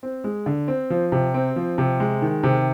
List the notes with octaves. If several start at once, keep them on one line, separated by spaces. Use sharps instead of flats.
C4
G#3
D3
C4
F3
C3
C4
F3
C3
G#3
D#3
C3